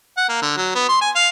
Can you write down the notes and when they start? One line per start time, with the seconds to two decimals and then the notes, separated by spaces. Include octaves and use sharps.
0.17 F#5
0.29 A#3
0.42 D3
0.57 F#3
0.75 B3
0.89 C6
1.01 G#5
1.15 F5